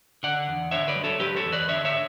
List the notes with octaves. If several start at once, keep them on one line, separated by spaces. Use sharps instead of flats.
D3 D5 F#5
E2
D3 C#5 E5
B4 D5
F#3
A4 C#5
F#3 G4 B4
A4 C#5
E2
B4 D5
D3 C#5 E5
C#5 E5